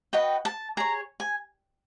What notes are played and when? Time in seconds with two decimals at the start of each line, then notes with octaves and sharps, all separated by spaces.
0.13 F#4 B4 D#5 G5
0.45 A5
0.77 G#4 C#5 A#5
1.20 G#5